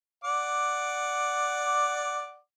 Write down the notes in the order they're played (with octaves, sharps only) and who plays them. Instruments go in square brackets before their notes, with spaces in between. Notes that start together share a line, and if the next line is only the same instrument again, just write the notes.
[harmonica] D5 F#5 D6